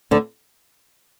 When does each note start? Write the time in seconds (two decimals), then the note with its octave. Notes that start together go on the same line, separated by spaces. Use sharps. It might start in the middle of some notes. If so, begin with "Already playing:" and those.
0.11 D2 D3